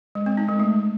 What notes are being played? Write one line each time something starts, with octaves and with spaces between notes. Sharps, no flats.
G#3
C4
D#4
G#3
A3